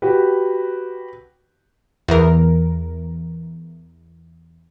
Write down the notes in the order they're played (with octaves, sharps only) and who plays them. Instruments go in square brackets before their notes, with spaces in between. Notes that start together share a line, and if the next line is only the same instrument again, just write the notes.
[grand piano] F#4 G4 B4
[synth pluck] E2 A#4